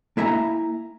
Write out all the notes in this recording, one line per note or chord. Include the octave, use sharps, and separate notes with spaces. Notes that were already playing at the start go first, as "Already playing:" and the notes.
A#3 E4 E5 G#5 A#5